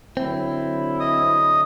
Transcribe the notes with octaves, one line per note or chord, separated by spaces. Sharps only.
D3 F#3 C4 E4
D#5 D#6